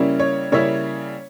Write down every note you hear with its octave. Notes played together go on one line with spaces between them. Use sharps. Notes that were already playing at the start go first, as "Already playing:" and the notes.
Already playing: C#3 G3 A#3 C#4 E4
C#5
C#3 G3 A#3 C#4 E4 C#5